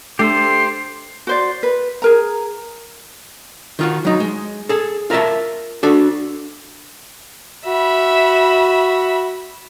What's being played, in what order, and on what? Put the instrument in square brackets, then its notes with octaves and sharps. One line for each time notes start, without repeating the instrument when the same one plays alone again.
[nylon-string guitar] A3 D4 [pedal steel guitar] G4 A4 C5 [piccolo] C7
[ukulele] F#4 C5 D5
B4
G#4 A#4 A#5
[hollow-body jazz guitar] D#3 F4 F#4
F#3 D#4
G#3
G#4 A4
F4 A#4 B4 E5 A5
D4 F#4 A4
[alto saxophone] F#4 [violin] E5 B5